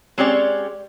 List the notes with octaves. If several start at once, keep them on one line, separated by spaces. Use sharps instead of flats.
G#3 C4 C#4 G4 C#5 D5